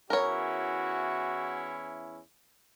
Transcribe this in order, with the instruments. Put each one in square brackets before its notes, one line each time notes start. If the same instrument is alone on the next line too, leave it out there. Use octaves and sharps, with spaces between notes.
[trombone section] E2 C#4 E4 [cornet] F#4 [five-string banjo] A#4 C#5